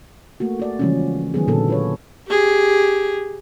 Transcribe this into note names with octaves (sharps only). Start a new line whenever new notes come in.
A3 A#3 F#4
F#4 D5
C#3 E3 F3 G3 G#3 C#4
D#3 F#3 B3 G#4
A#2 D3 B3 D#4 A4
F4 B4 C#5
G4 G#4